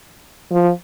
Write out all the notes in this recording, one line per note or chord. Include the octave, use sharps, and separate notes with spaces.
F3